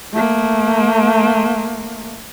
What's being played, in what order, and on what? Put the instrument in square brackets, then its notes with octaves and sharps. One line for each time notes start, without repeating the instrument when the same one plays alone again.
[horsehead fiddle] A3 A#3